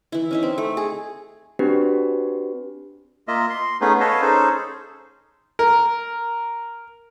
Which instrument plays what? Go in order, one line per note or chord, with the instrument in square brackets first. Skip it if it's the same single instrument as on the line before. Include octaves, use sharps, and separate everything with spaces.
[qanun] E3 E4
C#4 D#4 E5
C4
A3
G#4
[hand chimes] C4 D4 F#4 G4 B4
[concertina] A#3 F4 D#5 E5
C6
A3 B3 C#4 D#4 G#4 B4
A4 B4 C#5 D#5 F5 A5
C#4 D#4 G#4 A4 C5 A5
[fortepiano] A#4